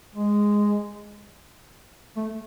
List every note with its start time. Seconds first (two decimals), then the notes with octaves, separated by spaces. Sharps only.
0.15 G#3
2.17 A3